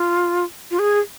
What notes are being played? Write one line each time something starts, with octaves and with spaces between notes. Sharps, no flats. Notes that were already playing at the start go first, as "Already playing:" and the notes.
Already playing: F4
F4
G#4